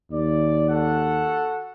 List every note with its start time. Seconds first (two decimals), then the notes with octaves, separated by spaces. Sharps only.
0.12 D#2 D5
0.70 F#4 A4 F#5